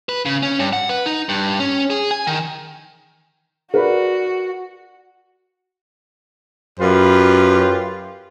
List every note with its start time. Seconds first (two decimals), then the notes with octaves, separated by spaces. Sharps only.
0.09 B4
0.26 C#3
0.43 C#4
0.59 G2
0.73 F#5
0.89 B4
1.06 D#4
1.29 G2
1.60 C#4
1.90 G#4
2.11 G#5
2.27 D#3
3.74 F#4 A#4 B4 D5
6.80 F#2 F4 G4 B4